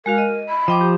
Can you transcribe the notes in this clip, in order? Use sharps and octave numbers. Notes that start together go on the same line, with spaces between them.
G#3 F#4 A#4 F5
D#5
B5
F3 D#5 G5 D6
G4